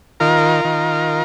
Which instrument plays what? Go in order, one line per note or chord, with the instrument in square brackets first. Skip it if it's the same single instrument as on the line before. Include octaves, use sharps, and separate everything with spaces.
[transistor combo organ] D#3 F4 A#4
D#3